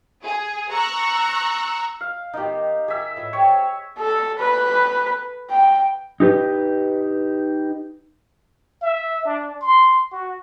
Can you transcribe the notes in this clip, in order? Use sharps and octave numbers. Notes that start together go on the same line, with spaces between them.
G#4
A#5 C#6 E6 F#6
F5
D#3 B3 D#4 G4
D#3 G#4 E5
A2 F4 B4
C4 G4 C#5
A4
B4
G5
D#4 G4 B4
E5
D4
C6
F#4